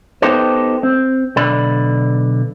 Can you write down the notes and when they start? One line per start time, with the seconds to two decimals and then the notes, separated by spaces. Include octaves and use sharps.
0.22 B3 D#4 G4 A4 C5
0.83 C4
1.36 B1 D3 D5 B5